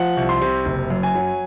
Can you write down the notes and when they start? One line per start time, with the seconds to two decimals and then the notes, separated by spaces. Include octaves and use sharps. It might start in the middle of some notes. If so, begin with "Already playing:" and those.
Already playing: F3 F#5
0.17 C2
0.29 C6
0.41 C3
0.66 F#1
0.90 F#2
1.03 G#5
1.15 F#3